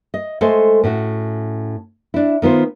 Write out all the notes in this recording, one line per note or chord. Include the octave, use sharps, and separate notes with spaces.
D#5
G#3 A3 A4 C5 G#5
A2 C#4 F#4
D4 E4
D#3 B3 F4 C5